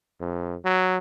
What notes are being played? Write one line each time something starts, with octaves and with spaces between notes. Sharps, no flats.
F2
F#3